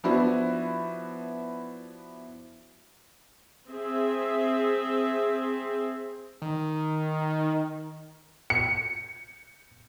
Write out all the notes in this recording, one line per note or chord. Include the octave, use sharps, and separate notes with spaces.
F3 B3 D4 E4 F#4
C4 G#4 E5
D#3
C#7